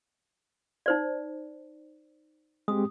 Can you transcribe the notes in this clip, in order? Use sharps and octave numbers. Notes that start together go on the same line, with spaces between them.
D#4 C5 D5
G#3 C4 G4 D#6